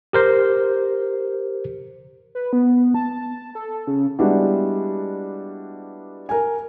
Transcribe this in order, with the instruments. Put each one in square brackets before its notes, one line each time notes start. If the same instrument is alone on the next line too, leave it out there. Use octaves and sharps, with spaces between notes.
[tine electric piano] G4 A#4 C5
[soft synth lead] B4
B3
A5
A4
C#3
[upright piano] G3 G#3 B3 D4 E4 F#4
A#4 G#5